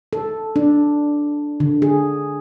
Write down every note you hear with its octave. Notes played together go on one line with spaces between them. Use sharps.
A4
D4
D3
G#4